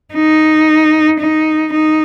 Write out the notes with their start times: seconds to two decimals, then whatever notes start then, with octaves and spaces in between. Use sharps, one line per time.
0.14 D#4
1.20 D#4
1.73 D#4